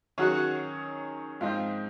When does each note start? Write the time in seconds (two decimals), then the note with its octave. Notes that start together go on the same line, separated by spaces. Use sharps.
0.18 D#3 F#3 C#4 F#4 G#4 C#5
1.41 G#2 F3 C4 D#4 F4